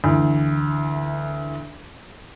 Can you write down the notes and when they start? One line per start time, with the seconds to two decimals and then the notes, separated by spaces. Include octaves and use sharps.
0.04 D2 E3